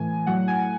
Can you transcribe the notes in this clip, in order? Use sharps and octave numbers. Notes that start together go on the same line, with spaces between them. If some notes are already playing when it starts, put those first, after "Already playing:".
Already playing: A2 E3 G#5
A2 F#3 F#5
G#5